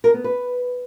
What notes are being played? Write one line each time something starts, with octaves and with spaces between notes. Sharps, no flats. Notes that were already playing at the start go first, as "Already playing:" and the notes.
A#4
B3
B4